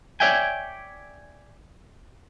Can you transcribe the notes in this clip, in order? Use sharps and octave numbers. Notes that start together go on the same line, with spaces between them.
C#5 D5 E5 G5 G#5